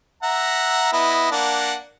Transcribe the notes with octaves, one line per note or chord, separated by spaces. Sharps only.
E5 F#5 A#5
B3 E4 D#5
A#3 D4 F#5